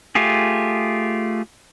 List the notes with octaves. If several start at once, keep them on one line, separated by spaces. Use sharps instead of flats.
A3 F4 G4 G#4